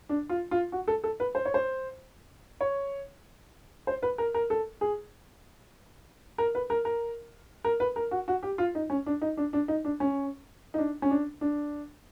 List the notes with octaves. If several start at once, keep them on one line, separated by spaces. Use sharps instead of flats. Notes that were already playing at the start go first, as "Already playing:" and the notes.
D4
F4
F4
F#4
A4
A4
B4
C5
C#5
C5
C#5
C5
B4
A#4
A#4
A4
G#4
A#4
B4
A#4
A#4
A#4
B4
A#4
F#4
F#4
G4
F4
D#4
C#4
D4
D#4
D4
D4
D#4
D4
C#4
D#4
D4
C#4
D4
D4